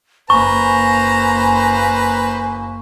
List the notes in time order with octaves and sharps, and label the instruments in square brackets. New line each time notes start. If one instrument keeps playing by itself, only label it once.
[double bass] F#1 A#3 [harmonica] B4 C5 A#5 [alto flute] G#5 [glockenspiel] C#6